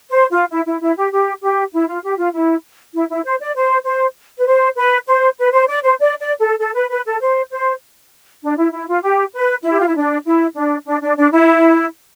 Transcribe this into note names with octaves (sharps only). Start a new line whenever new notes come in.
C5
F4
E4
E4
E4
G4
G4
G4
E4
F4
G4
F4
E4
E4
E4
C5
D5
C5
C5
B4
C5
B4
C5
B4
C5
D5
C5
D5
D5
A4
A4
B4
B4
A4
C5
C5
D4
E4
E4
F4
G4
B4
E4
G4
F4
E4
D4
E4
D4
D4
D4
D4
E4